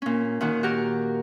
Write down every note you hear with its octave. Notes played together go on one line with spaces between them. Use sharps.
A#2 C#4
A#2 D#3 F#4
F#4 G4 A#4